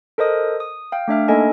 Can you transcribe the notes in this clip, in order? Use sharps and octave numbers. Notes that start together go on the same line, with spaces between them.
A4 A#4 C5 D#5 D#6
D#6
F5 G5
A3 D4 E5 F6
A#3 D4 D#4 A4 D#5 G#5